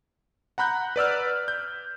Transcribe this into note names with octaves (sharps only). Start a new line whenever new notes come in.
F#5 A#5 B5 F#6 G6
B4 D5 E6 F6
G6